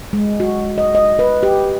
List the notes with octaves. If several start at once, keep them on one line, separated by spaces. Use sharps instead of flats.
G#3
F#4
D#5
D#5
B4
G4